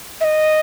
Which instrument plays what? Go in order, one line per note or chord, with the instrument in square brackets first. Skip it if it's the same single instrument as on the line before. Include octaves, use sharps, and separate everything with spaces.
[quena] E5
D#5